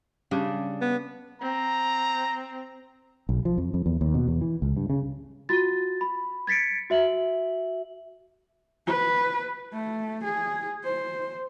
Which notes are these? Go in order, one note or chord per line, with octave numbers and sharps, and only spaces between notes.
C#3 G3 D4
B3
C4 A#5
B1
F3
F2
F2
E2
D#2
B2
E2
E3
C#2
G2
C#3
F4 F#4 A6
B5
G#6 A6 B6 C#7 D7
F#4 E5 F#7
B4
A3
G#4
C5